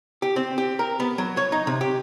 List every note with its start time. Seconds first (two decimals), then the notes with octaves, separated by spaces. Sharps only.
0.22 G4
0.36 C4
0.58 G4
0.79 A#4
1.00 B3
1.18 F#3
1.37 C#5
1.52 D#4
1.67 C3
1.81 G4